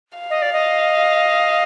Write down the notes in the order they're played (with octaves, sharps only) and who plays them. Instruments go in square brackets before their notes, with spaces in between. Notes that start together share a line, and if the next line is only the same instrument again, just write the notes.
[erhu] F5
[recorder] D#5
D5
D#5